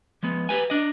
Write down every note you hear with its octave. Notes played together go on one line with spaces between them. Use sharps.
F3 G#3 B3
G4 B4 G#5
D4 D#5